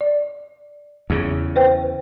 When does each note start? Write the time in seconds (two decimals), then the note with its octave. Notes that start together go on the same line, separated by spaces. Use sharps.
0.01 D5
1.10 E2 C#3
1.56 B4 C5 G5